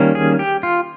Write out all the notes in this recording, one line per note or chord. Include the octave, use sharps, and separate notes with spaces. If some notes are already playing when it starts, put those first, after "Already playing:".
Already playing: D#3 G3 A#3 C#4
G#4
G4
F4